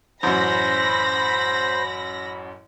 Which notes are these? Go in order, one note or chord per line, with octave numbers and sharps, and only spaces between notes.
A1 F#2 C5 B5 A#6